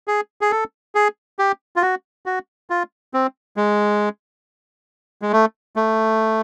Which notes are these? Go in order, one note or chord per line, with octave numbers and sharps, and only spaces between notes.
G#4
G#4
A4
G#4
G4
F4
F#4
F#4
F4
C4
G#3
G#3
A3
A3